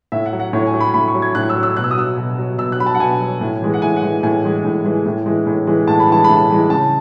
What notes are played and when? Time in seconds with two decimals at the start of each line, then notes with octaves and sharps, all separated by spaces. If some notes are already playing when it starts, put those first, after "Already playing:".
0.12 A2 E5
0.26 F#5
0.33 F#3
0.40 F#5
0.53 A2 C#5
0.67 G#5
0.74 F#3
0.80 B5
0.94 A2 B5
1.08 C#6
1.15 F#3
1.22 G#6
1.35 A2 F#6
1.49 E6
1.56 F#3
1.63 E6
1.77 B2 F#6
1.84 E6
1.91 D#6
1.97 F#3 E6
2.17 B2
2.38 F#3
2.58 B2 E6
2.72 F#6
2.80 F#3 B5
2.86 A5
2.95 F#5
3.00 B2 G#5
3.21 F#3
3.41 A2
3.62 E3 G#3
3.74 F#5
3.82 A2 G#5
3.96 F#5
4.02 E3 G#3
4.23 A2 G#5
4.44 E3 G#3
4.65 A2
4.85 E3 G#3
5.06 A2
5.26 E3 G#3
5.46 A2
5.67 E3 G#3
5.88 A2 A5
6.00 B5
6.08 E3 G#3 A5
6.24 A2 B5
6.37 A5
6.50 E3 G#3
6.69 C#3 A5